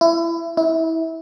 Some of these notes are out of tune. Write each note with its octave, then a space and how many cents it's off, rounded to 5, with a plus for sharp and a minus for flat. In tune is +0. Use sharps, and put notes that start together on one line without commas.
E4 +25
E4 -25